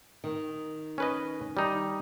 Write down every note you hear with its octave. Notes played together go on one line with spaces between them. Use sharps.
D#3
C#4 B4 D#5
G3 D#4